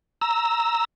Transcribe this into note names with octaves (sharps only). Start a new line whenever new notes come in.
A#5 E6